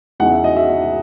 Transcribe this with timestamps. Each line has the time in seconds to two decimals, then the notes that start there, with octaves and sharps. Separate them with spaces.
0.20 E2 C#3 G#3 D#4 F#5
0.31 E5
0.44 D#5
0.56 E5